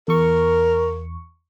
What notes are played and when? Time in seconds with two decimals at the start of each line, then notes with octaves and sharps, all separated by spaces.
0.08 E2 A#4 C#6